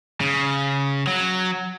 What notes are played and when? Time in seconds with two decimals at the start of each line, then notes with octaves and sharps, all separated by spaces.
0.21 C#3
1.07 F#3